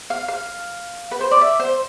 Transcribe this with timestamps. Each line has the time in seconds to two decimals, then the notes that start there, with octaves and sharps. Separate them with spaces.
0.10 F5
0.28 F5
1.11 B4
1.21 C5
1.31 D5
1.41 E5
1.60 C5